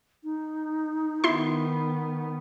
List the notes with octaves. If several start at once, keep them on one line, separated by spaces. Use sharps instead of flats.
D#4
D#3 B3 E4 C6